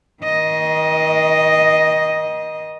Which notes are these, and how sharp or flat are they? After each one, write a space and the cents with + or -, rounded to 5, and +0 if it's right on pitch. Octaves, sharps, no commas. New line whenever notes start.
D#3 +35 D#5 +0